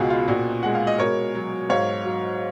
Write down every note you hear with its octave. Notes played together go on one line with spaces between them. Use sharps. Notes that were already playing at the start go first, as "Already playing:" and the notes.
Already playing: C#2 G#2 B2 F4 F#4 G#4
F4
A#2 F#4
G#3 F#5
F5
D#5
B2 A#4 C#5
F#3
G#2 C#5 F5
F#3